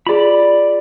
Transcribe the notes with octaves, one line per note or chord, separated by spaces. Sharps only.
F4 G#4 D5 B5